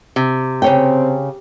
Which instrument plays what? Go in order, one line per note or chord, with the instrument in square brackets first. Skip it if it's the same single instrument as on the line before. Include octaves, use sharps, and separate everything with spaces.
[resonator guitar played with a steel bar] C3
[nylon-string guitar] C#3 C#5 G5 [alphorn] C4